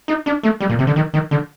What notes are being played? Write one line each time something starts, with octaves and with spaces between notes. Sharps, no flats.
D#4
D4
A3
G3
A#2
C3
D3
D#3
D#3
D3